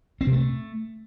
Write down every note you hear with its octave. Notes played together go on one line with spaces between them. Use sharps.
C4
C3
A3